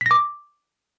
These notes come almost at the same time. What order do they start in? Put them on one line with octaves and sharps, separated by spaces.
B6 A#6 D6